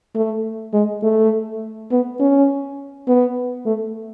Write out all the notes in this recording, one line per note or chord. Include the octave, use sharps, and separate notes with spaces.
A3
G#3
A3
B3
C#4
B3
A3